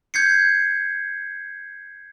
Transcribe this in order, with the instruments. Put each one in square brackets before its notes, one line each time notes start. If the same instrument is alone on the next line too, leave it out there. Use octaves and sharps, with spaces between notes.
[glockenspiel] G6 G#6 C7 C#7